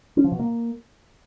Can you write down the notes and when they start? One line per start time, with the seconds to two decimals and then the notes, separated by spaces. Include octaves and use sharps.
0.17 C#4
0.24 F3
0.32 B2
0.39 A#3